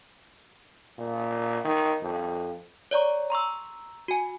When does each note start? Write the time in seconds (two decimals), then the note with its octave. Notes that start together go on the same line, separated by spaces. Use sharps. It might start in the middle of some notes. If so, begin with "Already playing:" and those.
0.98 A#2
1.65 D#3
2.02 F2
2.91 C#5 D5 A#5 C#6
3.30 A#5 C6 C#6 E6
4.08 F#4 G#5